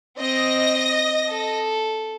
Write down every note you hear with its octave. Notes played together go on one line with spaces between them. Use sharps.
C4 D#5 A#6
A4